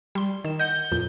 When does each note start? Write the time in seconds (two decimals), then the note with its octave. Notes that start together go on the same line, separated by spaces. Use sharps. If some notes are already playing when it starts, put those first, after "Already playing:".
0.15 G3 C6
0.45 D#3 E7
0.59 D#5 F#5 G6
0.92 F2 A#2